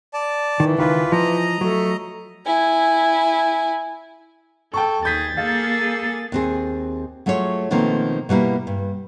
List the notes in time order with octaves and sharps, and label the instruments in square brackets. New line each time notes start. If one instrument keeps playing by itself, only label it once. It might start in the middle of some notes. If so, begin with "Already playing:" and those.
[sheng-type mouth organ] D5 A5
[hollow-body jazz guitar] D#3 [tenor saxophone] E3
[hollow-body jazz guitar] C#2 D#3 [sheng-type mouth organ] F4 B4
[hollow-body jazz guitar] F3 [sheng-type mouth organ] D#5 A#5
[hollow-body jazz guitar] F#3 [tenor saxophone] A3
[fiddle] E4 G#5
[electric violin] A4 [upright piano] G5 A5 C#6
[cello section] D#2 [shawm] G#4 [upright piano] G6 B6 [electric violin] A6
[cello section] A#3 G#4 [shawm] A4 [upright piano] F5
[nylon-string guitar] D#2 C4 G#4
F#3 A3 F4 G#4 C#5
B2 D#3 F3 A3 A#3 C4
B2 G3 A#3 E4
G2